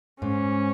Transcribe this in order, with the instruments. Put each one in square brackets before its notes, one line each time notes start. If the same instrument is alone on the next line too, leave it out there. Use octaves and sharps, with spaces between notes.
[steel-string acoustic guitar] G#2 [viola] C#4